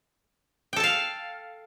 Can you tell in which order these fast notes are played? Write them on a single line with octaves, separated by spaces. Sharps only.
G5 A4 A5 F5